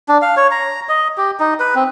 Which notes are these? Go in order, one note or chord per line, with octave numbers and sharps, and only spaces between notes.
D4
F5
C#5
A#5
D#5
G4
D#4
B4
C4